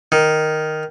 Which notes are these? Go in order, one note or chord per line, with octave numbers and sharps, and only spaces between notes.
D#3